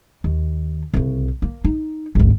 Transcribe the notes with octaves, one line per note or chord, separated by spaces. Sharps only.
D#2
C2 C#3
A#3
D#4
G#1 D2